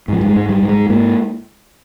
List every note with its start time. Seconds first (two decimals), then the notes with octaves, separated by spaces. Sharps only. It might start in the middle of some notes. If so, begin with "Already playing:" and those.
0.08 G#2 F3
0.21 G3
0.29 G#3
0.36 G#2
0.49 G3
0.62 G#2
0.69 G#3
0.89 G#2 A#3